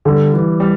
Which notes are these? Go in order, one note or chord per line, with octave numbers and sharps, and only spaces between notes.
D3 G3
E3
G3